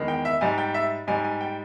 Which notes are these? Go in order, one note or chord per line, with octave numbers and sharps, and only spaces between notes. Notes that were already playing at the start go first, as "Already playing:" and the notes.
Already playing: E2 D#3 G#3
G5
E5
G#2 G3 G#5
G5
E5
G#2 G3 G#5
G#5
G5